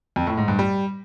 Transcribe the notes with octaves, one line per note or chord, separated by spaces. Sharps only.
F2
A2
G#2
G2
G3